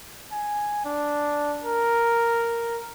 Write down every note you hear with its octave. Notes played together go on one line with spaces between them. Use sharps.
G#5
D4
A#4